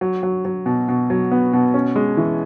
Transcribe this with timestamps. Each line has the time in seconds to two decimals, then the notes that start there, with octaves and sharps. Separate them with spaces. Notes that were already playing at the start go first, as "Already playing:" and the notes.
0.01 F#3
0.23 F#3
0.45 F#3
0.66 B2
0.88 B2
1.10 F#3
1.32 B3
1.53 B2
1.74 C#4
1.96 G#3
2.17 E3